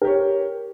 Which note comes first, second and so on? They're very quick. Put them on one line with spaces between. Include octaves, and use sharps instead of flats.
A#4 G4 C#5